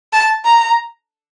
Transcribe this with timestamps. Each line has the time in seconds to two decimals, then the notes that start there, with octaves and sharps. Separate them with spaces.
0.13 A5
0.45 A#5